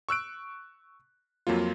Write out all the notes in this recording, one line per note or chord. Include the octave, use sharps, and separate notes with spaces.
C#6 E6 F#6 D7
F2 F#3 A#3 F4